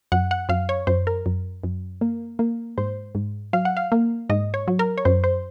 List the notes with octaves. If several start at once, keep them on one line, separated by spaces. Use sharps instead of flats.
F#2 F#5
F#5
F#2 F5
C#5
F#2 C5
A#4
F#2
F#2
A#3
A#3
G#2 C5
G#2
F#3 F5
F#5
F5
A#3
G#2 D#5
C#5
F#3
A#4
C#5
F#2 C5
C5